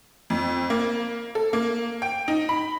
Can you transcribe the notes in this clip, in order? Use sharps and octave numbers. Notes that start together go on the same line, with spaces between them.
F2
A#3
A4
A#3
G5
D#4
B5